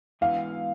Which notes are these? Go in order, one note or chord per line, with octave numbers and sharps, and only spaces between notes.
G#2 E3 B3 E4 F5